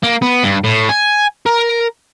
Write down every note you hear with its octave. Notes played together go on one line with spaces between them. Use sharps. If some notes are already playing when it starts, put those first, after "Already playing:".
A#3
B3
G2
A2
G#5
A#4